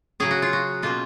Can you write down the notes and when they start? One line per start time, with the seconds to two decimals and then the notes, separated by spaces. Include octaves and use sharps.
0.20 C#3 F#3 C#4 G#4
0.31 F#4
0.42 F4
0.53 F#4
0.82 B2 A#3 C#4 F4